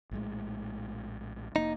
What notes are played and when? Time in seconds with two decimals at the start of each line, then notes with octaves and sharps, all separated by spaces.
0.11 A#1 A2 G#3
1.56 F1 A#3 D#4